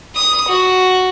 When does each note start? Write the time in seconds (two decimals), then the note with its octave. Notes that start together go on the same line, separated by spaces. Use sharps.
0.16 D#6
0.49 F#4